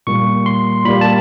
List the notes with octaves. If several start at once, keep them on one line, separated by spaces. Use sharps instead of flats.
A#2 G3 A#3 C#6
C6
A#2 G3 A#3 B5
A5